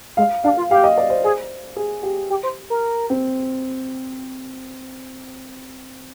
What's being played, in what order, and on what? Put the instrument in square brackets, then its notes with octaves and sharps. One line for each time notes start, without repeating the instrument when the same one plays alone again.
[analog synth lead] G#3 [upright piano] F5
[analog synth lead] D4 [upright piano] F5
[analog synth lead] F4
[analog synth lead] G4 [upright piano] F5
[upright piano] D#5
D5
C5
[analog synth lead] G#4
[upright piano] G#4
G4
[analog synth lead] G4
C5
A#4
[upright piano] C4